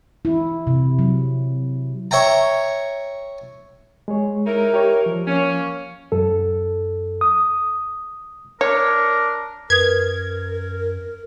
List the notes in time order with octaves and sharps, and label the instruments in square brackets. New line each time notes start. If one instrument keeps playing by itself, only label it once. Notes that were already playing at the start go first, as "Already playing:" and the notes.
[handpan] E4
C3
F#3
[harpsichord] C#5 E5 G5 A#5
[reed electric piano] G#3 G#4 C#5
[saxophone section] D#4 E4 A#4
[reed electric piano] G4 C#5
F3
[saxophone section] A#3 C#4
[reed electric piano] F#2 A4
D#6
[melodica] D4 [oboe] A#4 [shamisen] C#5
[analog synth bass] F#2 [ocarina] A#4 [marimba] B4 D#6 [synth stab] G#6